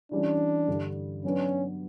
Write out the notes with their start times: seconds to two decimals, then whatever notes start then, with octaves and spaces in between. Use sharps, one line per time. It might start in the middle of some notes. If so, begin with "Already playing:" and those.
0.11 E3 G3 C#4 D4 G4
0.68 G2 D3 G3
1.25 F#3 B3 C#4 D4 F#4 B4